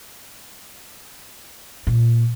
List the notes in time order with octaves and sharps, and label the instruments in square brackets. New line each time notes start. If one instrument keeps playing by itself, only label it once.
[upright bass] A#2